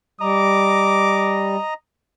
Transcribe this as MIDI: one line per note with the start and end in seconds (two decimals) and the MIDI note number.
0.21 1.56 55
0.21 1.74 75
0.21 1.74 82
0.21 1.50 86